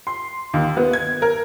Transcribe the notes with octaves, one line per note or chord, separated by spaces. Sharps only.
C6
D#2
B3
G#6
A#4